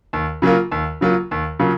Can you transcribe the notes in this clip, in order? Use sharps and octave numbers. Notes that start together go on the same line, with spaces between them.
D#2
C#3 F#3 A#3 F4
D#2
C#3 F#3 A#3 F4
D#2
C#3 F#3 A#3 F4